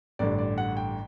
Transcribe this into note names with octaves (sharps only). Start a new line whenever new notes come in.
A1 G2 D3 D5
D5
F#5
G5